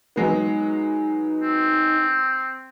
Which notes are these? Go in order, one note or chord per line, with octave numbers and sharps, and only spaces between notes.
F#3 G#3 B3 D#4
C4